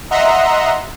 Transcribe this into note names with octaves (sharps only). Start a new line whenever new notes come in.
D#5 E5 F#5 A#5 C6